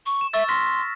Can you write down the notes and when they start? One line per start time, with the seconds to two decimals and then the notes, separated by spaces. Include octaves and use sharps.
0.06 C#6
0.21 E7
0.33 E5 C#6 E6 A6
0.48 C6 F6 A#6 B6